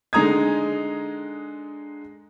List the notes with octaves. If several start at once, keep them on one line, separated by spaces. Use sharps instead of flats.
D3 G#3 D#4 A#5 D#6 G#6